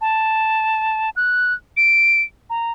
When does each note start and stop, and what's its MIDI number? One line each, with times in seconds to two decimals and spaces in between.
0.01 1.10 81
1.16 1.53 90
1.77 2.21 98
2.50 2.72 82